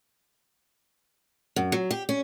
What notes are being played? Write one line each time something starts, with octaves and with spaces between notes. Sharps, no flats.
F#2
F#3
G4
C#4